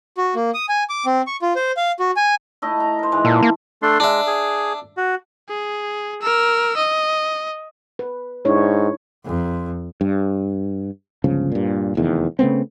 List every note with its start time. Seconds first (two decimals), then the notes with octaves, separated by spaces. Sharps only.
0.18 F#4
0.35 A#3
0.54 D#6
0.69 G#5
0.89 D6
1.06 C4
1.27 C#6
1.42 F4
1.56 C5
1.77 F5
2.00 F#4
2.17 G#5
2.62 A3 E4 D#5
2.80 A#5
2.99 A#4 C5
3.12 G#2 E3 G#3
3.25 A#2 A4
3.42 A#3
3.82 A3 D4 C6
4.00 G#3 D4 E5
4.27 G#4
4.97 F#4
5.49 G#4
6.22 A#4 E6
6.77 D#5
7.99 B4
8.45 G#2 D4 E4 C#5
9.25 F2
10.01 G2
11.24 G1 C#2 C#3 F3
11.52 G2 A#2
11.95 F1 E2 D#3
12.39 C#3 A3 B3 C4